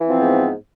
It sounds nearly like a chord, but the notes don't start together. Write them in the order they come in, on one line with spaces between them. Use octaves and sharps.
E3 C4 F3 B3 G#2